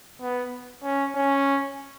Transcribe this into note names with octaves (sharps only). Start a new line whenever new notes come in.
B3
C#4
C#4